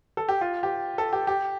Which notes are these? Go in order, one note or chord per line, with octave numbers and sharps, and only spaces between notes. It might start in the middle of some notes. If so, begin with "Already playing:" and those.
A4
G4
F4
G4
A4
G4
G4